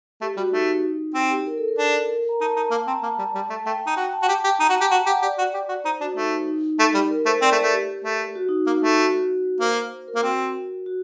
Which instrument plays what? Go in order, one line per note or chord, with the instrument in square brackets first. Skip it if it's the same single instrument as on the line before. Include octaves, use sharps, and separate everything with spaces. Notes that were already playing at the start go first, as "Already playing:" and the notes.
[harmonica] A3 [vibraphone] G4
[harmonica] G3 [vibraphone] F#4
[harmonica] A3 [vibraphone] D#4
[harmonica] C4
[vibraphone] G4
A#4
A4
A#4
[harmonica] D4
[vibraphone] A#4
A#5
[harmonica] D#4 [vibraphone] A5
[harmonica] D#4 [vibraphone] A#5
[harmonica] A#3 [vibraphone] A5
[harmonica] C4 [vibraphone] A#5
[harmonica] A#3 [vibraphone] A5
[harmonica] G3
G3
A3
[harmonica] A3 [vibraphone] G5
[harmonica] D#4
[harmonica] F#4 [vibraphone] G5
[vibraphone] A5
[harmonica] F#4
G4
G4
[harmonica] D#4 [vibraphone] A#5
[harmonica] F#4
[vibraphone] A5
[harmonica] G4
[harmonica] F#4 [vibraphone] G5
[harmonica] G4 [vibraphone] F#5
[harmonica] G4 [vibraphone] D5
[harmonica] F#4
G4
F#4
[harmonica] D#4 [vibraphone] C5
[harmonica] D4 [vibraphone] F#4
[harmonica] A3 [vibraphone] D#4
[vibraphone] D#4
[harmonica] A3 [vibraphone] D#4
[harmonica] G3 [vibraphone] G4
[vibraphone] A#4
[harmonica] A3 [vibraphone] C5
[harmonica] C4 [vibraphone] D5
[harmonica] A3
A3
[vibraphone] G4
[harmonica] A3
[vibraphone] F#4
D#4
[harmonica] A#3
[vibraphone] D#4
[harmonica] A3
[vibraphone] F#4
[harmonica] A#3 [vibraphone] C5
[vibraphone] C5
A#4
[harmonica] A#3
[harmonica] C4 [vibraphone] F#4
[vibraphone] F#4